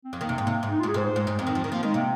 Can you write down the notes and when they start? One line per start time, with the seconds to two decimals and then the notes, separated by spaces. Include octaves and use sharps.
0.04 C4
0.13 F2
0.21 D#3 A#3
0.29 C3
0.38 G#2 A#3
0.47 C3
0.63 G#2
0.71 D#4
0.80 F4
0.83 G#2
0.88 G#4
0.94 G#2 C5
1.05 C5
1.16 G#2
1.27 G#2
1.39 F2 C4
1.47 D#3
1.55 F3
1.64 D#3
1.72 F3 A#3
1.83 D#3 G#3
1.94 C3 A#3